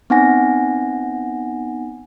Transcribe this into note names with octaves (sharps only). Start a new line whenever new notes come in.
B3 C4 D#4 F#5 G#5 A#6